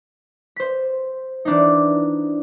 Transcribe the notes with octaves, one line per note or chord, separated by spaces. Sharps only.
C5 B6
E3 D4 D#4